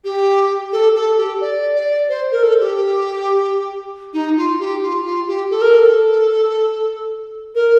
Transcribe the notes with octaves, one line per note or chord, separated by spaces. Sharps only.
G4
A4
A4
G4
D5
D5
C5
A#4
A4
G4
D#4
F4
G4
F4
F4
G4
A4
A#4
A4
A#4